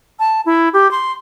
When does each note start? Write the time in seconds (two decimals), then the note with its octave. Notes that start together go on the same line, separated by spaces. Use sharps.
0.19 A5
0.46 E4
0.73 G4
0.91 C6